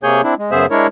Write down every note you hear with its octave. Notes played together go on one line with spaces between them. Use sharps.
C3 A#3 G#4 C#5 G#5 G6
C4 D4 E4
G#3
F#2 C#3 B3 G#4 C5 E5
G#3 D4 E4 A#4 C#5